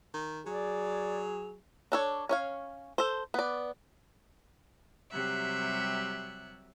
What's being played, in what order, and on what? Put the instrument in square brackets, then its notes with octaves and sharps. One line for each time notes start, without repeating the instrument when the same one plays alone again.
[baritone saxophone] D#3
[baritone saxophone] F#3 [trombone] G#4 [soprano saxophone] D5
[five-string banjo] D4 A4 C#5
C#4 C#5 F5
A4 C5
B3 D5
[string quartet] C3 F#3 G3 G4 E5 F#6